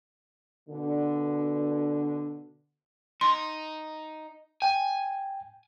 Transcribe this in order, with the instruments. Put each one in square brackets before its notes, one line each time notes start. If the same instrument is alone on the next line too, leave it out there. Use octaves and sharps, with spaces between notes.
[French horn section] B2 D3
[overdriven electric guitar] D#4 [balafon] C6
[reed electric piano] G5 [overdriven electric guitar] G#5